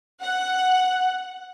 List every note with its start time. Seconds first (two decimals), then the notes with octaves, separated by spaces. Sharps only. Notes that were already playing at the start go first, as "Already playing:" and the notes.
0.22 F#5